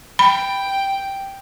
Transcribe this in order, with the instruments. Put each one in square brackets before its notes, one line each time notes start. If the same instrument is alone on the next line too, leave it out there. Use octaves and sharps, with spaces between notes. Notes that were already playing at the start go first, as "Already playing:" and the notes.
[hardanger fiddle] G5 [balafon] B5